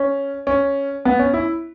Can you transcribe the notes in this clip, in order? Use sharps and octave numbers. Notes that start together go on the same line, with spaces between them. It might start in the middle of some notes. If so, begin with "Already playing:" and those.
Already playing: C#4
C#4
B3
C#4
E4